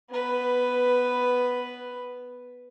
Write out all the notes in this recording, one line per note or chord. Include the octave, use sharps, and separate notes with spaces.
B3 B4